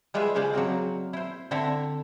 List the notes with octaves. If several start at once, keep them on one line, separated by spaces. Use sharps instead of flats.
G3 G#3 F4 G#4 B4 E5
C#3 G#3 C#4 C5 D5
F#3 A#3 C4 A#4
E4 C5
D3 C4 E4 A4 E5 A#5